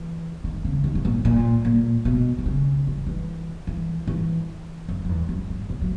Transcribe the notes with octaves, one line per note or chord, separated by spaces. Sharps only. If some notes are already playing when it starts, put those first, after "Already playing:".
Already playing: E3
D#3
C#3
D#3
G#2
A#2
A#2
A#2
B2
D#3
C#3
E3
E3
E3
E3
F#2
F#2
E2
F#2
G#2
A#2
F#3